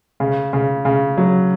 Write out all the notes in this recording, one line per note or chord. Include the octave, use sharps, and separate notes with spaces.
C#3
C#3
C#3
F#3